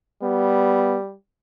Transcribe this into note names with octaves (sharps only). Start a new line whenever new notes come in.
G3 B3